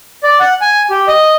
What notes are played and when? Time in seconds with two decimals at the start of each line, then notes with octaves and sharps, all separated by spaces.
0.23 D5
0.40 F#5
0.61 G#5
0.90 G4
1.08 D#5